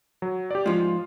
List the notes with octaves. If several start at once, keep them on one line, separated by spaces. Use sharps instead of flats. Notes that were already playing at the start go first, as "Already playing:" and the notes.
F#3
G4 D5
G#2 F3 F4